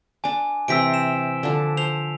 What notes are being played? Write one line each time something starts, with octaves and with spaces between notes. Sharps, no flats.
D4 G#5 D6
C3 E3 C4 E6 B6 D7
E7
D3 F3 D4
C5 F7